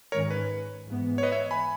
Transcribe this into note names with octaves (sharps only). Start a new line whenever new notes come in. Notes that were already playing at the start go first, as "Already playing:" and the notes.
G#2 D#3 G#3 C#4 A#4 C#5
B4
G#2 E3 B3
C#5
B4 D#5
C#5 E5
G#5 B5